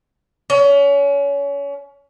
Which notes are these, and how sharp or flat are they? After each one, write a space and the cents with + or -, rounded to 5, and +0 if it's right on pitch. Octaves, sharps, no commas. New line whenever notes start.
C#4 +30